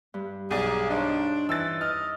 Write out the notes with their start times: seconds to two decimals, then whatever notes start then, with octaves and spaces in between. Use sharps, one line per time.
0.14 G2
0.51 B1 G#4 D5
0.90 D4 D#4 C5 C#5
1.49 E3 E6 A6
1.81 D#5 F6